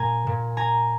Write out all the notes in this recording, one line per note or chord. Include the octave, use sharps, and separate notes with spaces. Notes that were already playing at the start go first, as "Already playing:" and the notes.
Already playing: A#2 G#5 A#5
A#2
G#5 A#5